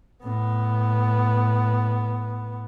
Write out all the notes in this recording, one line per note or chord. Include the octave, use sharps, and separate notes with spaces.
A2 B3